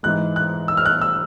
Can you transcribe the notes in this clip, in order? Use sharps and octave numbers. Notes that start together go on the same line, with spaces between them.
G#2 E3 G#3 F#6
F#6
E6
F6
F#6
E6